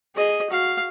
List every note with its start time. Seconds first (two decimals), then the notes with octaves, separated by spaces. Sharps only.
0.16 G#4 D#5
0.50 F#4 F5